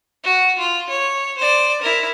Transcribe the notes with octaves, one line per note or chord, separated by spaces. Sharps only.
F#4
F4
C#5
C5 D5
E4 A#4